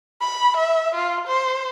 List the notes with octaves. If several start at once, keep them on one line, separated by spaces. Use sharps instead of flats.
B5
E5
F4
C5